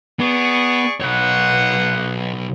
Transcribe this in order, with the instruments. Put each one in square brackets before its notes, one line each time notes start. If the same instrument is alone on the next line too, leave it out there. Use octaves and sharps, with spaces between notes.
[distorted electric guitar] B3 [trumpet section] G#4 D5 C#6
[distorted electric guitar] B1 C#5 [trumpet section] A#3 B3 F#5